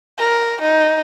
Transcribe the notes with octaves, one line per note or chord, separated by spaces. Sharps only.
A#4
D#4